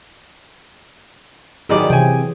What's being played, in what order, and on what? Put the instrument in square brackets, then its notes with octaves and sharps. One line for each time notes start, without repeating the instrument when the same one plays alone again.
[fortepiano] B2 D#3 D5 [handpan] F#3 G4 G#4
[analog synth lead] C3 [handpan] E3 [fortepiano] G5 G#5